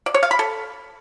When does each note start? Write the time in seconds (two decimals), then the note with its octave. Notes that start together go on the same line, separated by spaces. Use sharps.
0.06 D5
0.14 C#5
0.23 F5
0.31 B5
0.39 A4